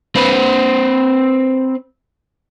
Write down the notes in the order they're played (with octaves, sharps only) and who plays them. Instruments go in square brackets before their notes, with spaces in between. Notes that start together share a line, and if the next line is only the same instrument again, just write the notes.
[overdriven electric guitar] C4 B4